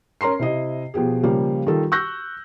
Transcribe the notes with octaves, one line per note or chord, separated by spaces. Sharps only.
C#4 A#4 A#5 C6 C7
C3 E4 D#5
B2 F3 G4 G#4
C#3 F3 G3 A#3
D#3 G3 F4 A4
C#6 E6 F#6 G6 A#6